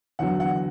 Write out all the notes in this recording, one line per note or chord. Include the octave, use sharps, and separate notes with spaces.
E2 D3 F#3 F#5
F#5